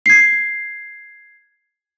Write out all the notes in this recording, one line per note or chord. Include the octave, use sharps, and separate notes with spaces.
G#6 C7